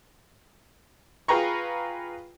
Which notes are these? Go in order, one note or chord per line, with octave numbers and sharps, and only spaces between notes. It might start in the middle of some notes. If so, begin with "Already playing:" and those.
F4 G#4 B4 G5 A#5 C#6